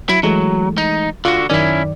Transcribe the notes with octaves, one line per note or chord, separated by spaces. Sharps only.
F#3 E4
E3 F#3 G#3 A3
D#4
D3 F4 F#4 C#6
F#2 D#3 C#4 E4 D5